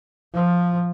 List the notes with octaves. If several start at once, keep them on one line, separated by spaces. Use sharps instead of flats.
F3